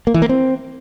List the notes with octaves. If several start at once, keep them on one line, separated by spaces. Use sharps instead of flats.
A#3
E3
A#3
C4